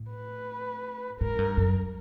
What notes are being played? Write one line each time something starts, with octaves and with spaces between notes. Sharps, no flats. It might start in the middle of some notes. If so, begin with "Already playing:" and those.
Already playing: A2
B4
G#2 A#4
G2
F#2